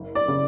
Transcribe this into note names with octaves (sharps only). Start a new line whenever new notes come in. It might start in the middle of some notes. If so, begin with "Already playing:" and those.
Already playing: F#1
D5
C#3